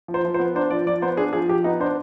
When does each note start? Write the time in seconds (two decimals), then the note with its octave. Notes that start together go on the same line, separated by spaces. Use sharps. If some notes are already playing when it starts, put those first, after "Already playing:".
0.08 F3
0.14 C5
0.25 F3
0.34 C5
0.39 B3
0.55 D4 C5
0.70 F3 D5
0.87 F3 D5
1.02 B3 C5
1.17 D4 G#4
1.33 F3 G#4
1.49 F3 G4
1.64 B3 D#4
1.80 D4 C5